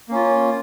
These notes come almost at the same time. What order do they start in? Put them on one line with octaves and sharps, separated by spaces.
A#3 C#4 F4